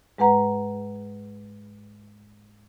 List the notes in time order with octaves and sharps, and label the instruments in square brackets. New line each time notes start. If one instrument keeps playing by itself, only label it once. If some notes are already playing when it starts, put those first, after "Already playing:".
[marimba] G#2 G#3 B4 F#5 A#5